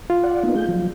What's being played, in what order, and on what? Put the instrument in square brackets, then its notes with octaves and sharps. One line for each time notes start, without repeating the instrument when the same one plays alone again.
[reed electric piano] F4
[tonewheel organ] D5 F#5
A#3 B3 D#4
A3 G#4 G6
F3 F#3